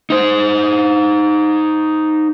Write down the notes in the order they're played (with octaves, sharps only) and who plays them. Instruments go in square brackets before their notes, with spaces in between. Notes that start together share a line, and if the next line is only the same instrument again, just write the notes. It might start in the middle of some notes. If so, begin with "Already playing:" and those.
[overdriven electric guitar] D#4 C5